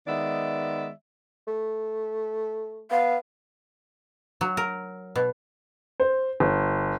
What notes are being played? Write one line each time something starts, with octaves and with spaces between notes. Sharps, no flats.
D#3 G#3 B3 D5 E5
A3
B3 F5
F#3
A#4
B2
C5
G1